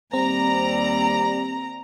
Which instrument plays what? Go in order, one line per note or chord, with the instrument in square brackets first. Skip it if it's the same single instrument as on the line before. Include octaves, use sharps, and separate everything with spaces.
[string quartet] D#2 D5 [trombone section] G3 [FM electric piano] C4 [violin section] A#5